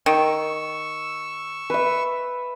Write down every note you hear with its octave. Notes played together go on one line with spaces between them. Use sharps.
D#3 C#6 E6
B4 E5